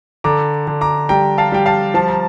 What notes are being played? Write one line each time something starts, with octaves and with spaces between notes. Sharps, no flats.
D3 A#5 D6
D3
A#5 D6
G3 G5 A#5
F5 A5
G3 G5
F5 A5
F3 A5
A#5